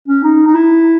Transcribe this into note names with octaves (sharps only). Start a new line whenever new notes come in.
C#4
D#4
D#4
E4